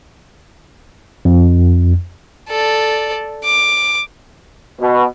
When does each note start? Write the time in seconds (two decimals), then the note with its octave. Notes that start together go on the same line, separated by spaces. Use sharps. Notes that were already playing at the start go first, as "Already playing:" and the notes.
1.25 F2
2.49 A4 D5
3.44 D6
4.81 B2